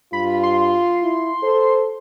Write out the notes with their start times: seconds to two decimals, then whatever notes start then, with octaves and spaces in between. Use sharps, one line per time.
0.13 G2 F4 B5
0.43 C6
1.03 E4
1.43 A4 C5